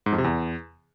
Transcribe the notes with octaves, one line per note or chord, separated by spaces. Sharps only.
G#2
F2
C3
E2